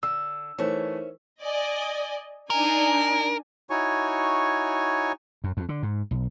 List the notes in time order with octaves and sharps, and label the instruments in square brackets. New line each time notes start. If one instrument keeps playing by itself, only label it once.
[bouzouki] D3 [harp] E6
[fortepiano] E3 A3 [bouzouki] C#4 E5 [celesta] D#4 A#4 C5
[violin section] D5 D#5 G#5
[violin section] D4 D#4 G#5 [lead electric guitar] A#4
[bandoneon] D#4 E4 F#4 C#5 G#5 C#6
[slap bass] F#2
F2
D3
G#2
B1